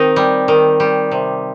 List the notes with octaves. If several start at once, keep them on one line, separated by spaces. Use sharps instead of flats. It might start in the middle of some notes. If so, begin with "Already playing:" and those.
Already playing: D#3 C4 D#4
G3
D#3
G3
C3